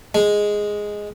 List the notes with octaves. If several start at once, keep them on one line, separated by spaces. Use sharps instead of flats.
G#3